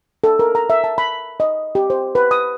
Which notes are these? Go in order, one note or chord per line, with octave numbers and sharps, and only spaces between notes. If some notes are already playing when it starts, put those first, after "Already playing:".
A4
A#4
A#5
E5
A5
B5
D#5
G4
C5
B4
D#6